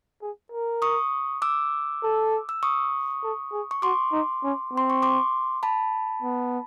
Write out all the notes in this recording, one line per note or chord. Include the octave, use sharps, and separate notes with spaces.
G#4
A#4
C#6 D#6
D6 E6
A4
E6
C#6 D#6
A4
G#4
C#6
F#4 C6 D6
D#4
C#4
C4 C6
C#6
C6 D6
A5 B5
B3